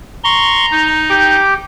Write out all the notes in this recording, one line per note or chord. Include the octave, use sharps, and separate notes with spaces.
A#5 C6 C#6
D#4
G4 G5 D6